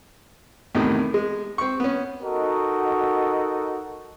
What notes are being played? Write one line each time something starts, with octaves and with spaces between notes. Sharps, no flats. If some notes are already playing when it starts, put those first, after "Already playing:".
E2 A2 C3 D#3
G#3
C4 C#6
B3 C#4
D#4 F#4 A4 A#4 D#5